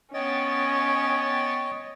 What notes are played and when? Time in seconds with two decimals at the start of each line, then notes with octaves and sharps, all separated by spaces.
0.14 B3 C#4 C#5 D#5 G5 A6